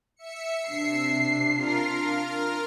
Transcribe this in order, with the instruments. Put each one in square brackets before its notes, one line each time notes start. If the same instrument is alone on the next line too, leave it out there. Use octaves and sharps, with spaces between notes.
[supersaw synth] E5 C#7
[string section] C3 C7 [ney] D4
[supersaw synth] F4 A#4 F6